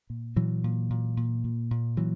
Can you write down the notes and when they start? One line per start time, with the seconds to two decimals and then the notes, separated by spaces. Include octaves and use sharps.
0.10 A#2
0.36 A#2 E3 F#3
0.64 A#2
0.90 A#2
1.17 A#2
1.44 A#2
1.71 A#2
1.97 A#2 E3 F#3